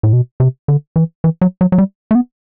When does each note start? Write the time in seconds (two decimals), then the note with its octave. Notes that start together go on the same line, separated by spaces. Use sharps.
0.03 A2
0.13 B2
0.40 C3
0.68 D3
0.96 E3
1.24 E3
1.41 F#3
1.61 F#3
1.72 F#3
1.78 G3
2.11 A3
2.15 B3